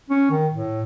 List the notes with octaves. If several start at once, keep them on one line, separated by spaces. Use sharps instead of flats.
C#4
D#3
A2